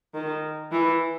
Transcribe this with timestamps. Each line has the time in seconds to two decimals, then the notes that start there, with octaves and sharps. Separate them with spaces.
0.14 D#3
0.71 E3